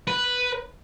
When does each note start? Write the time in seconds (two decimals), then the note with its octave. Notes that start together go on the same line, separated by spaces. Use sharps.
0.07 B4